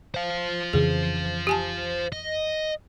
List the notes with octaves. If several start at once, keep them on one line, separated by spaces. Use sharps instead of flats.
C5 F5
F2 C#3 E3 G#4
G4 G#5 A5
D#5